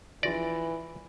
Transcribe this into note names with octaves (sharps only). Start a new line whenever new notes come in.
A#1 E3 F4 D5 A#6